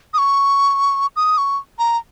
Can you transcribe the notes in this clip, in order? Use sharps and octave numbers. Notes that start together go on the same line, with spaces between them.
D#6
C#6
D#6
C#6
A#5